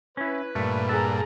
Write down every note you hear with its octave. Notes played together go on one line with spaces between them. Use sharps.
C#4 E4 B4
G2 A#2 A3
G#4 A4 A#5